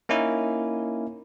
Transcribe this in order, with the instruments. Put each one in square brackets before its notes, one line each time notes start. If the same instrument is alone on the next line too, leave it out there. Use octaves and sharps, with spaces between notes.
[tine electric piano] A#3 C#4 D#4 E4